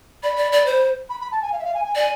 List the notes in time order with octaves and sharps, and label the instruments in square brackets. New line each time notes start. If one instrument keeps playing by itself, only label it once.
[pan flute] D5 [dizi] B5
[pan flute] D5
D5
C5
[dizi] B5
B5
A5
G#5
F5
E5
F5
G#5
G#5
[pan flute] D5 [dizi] G#5